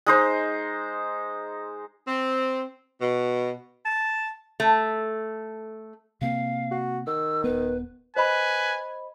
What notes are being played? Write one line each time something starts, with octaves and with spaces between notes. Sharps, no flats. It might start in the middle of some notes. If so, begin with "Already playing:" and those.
G#3 D#4 C5
C4
B2
A5
A3
C3 A#3 C4 F5
F#4
D#3 E6
D#1 B3 B4
B4 C5 D#5 G#5 B5